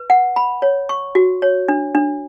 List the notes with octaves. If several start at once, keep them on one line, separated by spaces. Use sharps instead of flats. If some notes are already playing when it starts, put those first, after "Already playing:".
Already playing: B4
F#5
B5
C#5
C#6
F#4
C#5
D4
D4